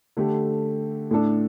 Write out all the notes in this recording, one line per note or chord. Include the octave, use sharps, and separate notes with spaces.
D3 A3 G4
A2 A3 D4 A4